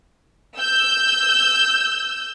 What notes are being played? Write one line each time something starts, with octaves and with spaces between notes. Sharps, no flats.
E6 G6